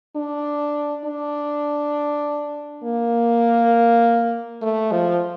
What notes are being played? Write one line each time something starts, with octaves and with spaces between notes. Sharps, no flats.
D4
D4
A#3
A3
F3